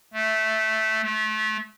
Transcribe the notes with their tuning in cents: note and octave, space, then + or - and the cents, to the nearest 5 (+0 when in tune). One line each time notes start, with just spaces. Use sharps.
A3 -10
A3 -30